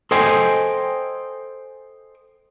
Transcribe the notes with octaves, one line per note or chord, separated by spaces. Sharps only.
A4 C5 D#5 G5 G#5